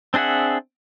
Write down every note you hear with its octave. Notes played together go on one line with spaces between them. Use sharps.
C4 D4 G#4 E5 F#5